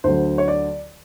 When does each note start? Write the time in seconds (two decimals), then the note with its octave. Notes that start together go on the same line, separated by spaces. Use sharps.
0.04 D2 D3 F#3 C5
0.38 C#5
0.48 D5